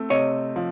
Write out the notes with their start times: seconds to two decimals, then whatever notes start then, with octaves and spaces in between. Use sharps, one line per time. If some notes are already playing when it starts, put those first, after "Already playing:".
Already playing: A3 C4
0.10 C3 C#5 D#5
0.56 F3